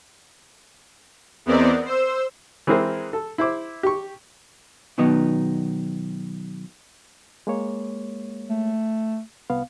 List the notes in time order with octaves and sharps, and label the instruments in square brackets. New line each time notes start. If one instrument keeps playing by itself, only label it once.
[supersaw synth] E2 B3 C4 A#4 D5 D#5
C5 E6
[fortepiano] E3 G#3 C4 G#4 A#4 C5
A4
E4 C5 D6
G4 C#6
[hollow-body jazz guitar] B2 D#3 F#3 B3 D#4
[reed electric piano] G#3 A#3 C#5
[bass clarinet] A3
[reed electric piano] C2 B3 F5